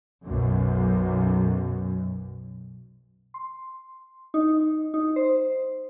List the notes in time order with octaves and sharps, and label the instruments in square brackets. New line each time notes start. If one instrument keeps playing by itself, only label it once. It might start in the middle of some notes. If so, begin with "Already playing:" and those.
[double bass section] B1 F#2
[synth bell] C6
D#4
D#4
C5